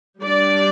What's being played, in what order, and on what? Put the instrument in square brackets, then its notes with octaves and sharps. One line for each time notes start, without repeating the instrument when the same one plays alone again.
[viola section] G3 D4 D5